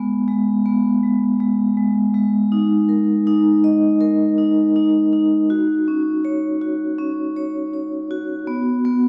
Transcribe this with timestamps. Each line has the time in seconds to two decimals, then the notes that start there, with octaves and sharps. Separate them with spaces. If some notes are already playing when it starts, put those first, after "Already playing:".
Already playing: G#3 B3
0.28 G#3
0.66 B3
1.03 G#3
1.40 G#3
1.77 G#3
2.14 G#3
2.52 D#4
2.89 A#4
3.27 D#4
3.64 D#5
4.01 A#4
4.38 D#4
4.76 D#4
5.13 D#4
5.50 F#4
5.88 C#4
6.25 C#5
6.62 F#4
6.98 C#4
7.36 C#5
7.73 C#5
8.11 F#4
8.47 B3
8.85 B3